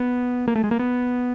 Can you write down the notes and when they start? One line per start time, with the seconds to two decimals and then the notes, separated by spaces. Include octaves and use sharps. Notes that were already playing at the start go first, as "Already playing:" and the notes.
Already playing: B3
0.48 A#3
0.55 A3
0.64 G#3
0.71 A#3
0.79 B3